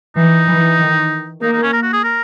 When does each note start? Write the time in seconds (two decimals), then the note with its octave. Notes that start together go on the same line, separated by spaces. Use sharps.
0.16 E3 D#4
0.47 E3
0.79 D#3
1.42 A#3 D#4
1.52 D#4
1.63 C#4
1.73 A#4
1.83 F#4
1.93 G#4
2.04 A#4